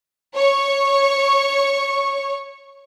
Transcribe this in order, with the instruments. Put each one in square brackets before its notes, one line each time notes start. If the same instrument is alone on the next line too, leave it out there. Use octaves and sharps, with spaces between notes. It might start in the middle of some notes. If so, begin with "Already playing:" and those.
[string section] C#5 C#6